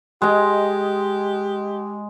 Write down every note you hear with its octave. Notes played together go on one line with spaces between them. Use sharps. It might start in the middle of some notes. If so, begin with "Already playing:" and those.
G#3 G4 D#5